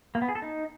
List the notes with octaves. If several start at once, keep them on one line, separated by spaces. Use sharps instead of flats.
A#3
B3
G#4
A4
D#4